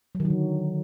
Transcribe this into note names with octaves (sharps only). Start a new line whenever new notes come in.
F#3
D#3
F#3
D3